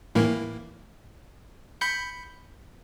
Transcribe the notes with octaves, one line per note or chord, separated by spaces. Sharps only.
A2 E3 A#3
B5 G6 C#7